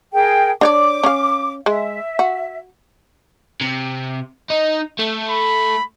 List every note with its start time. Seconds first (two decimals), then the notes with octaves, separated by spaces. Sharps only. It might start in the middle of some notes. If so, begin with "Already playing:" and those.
0.13 G#4 A#4 G5
0.61 D4 C#5 D5 D6
1.04 C#4 F5
1.66 G#3 E5
2.19 F#4
3.61 C3
4.50 D#4
4.99 A3
5.30 B5